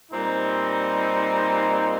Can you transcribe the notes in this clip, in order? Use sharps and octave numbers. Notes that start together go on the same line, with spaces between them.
A#2 G3 C4 D#4